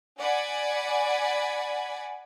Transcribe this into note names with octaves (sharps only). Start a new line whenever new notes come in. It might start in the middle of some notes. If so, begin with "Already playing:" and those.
D5 F#5 G#5 B5